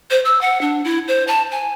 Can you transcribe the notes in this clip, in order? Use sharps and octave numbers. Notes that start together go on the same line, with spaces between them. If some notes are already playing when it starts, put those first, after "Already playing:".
C5
E6
F#5
D4
E4
C5
A5
G#5